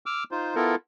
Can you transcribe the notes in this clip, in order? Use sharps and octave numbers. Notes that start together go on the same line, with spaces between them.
D6 E6 F6
D#4 F4 C5
B3 E4 F4 A4 A#4